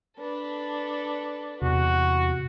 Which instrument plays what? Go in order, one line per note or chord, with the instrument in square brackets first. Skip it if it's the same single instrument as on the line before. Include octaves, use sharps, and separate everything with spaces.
[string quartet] D4 A4 B4
[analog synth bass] E2 [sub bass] C3 [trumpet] F#4